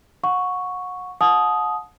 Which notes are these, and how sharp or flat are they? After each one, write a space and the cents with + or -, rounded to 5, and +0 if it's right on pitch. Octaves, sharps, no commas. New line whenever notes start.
F#5 -30 C#6 +0
F#5 -40 A5 -30 D#6 +0